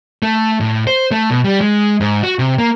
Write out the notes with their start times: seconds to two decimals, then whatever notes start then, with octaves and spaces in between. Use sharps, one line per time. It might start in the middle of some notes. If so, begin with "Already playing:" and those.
0.23 A3
0.60 A2
0.87 C5
1.12 A3
1.30 B2
1.44 G3
1.61 G#3
2.00 G#2
2.23 F#4
2.39 C3
2.58 A#3